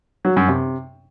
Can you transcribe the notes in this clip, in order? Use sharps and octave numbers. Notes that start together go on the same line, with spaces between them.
F#3
F#2
C3